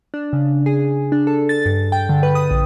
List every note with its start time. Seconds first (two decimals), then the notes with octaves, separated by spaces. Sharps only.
0.14 D4
0.33 C#3
0.66 G#4
1.12 D4
1.27 A4
1.49 A6
1.66 G2
1.92 G5
2.09 D3
2.23 B4
2.35 D#6
2.51 A#1